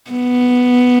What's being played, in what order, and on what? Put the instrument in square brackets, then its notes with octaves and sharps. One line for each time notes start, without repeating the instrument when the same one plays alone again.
[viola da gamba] B3